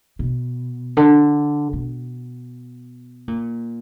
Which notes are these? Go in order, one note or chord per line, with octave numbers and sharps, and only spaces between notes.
B2
D3
B2
A#2